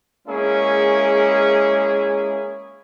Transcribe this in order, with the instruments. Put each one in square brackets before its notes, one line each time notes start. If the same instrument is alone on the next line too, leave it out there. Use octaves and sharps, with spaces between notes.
[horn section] G#3 A#3 C#4 E4 G#4